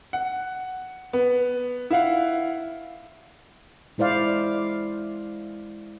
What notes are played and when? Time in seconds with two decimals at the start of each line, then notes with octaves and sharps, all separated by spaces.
0.13 F#5
1.13 B3
1.90 E4 F4 F5 F#5
3.98 G#3 E4 C5 D5 F5